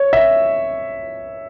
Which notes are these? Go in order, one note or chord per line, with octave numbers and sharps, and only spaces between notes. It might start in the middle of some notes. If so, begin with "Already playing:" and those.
Already playing: C#5
E5